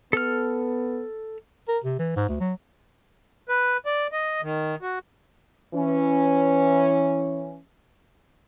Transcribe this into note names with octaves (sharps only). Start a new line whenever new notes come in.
B3 A4 F6
A#4
C3
E3
G#2
D2
F#3
B4
D5
D#5
D#3
F#4
E3 C#4